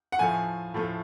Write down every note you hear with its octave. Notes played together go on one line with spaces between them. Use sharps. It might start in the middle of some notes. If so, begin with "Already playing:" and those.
F#5
A2 F3 A3 G#5
A2 F3 A3